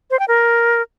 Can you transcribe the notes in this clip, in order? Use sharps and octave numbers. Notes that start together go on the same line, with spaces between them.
C5
G5
A#4